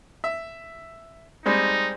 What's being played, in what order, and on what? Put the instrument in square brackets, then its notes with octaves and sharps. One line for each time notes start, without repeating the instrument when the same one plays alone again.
[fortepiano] E5
[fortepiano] G3 G#3 C4 [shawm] D#4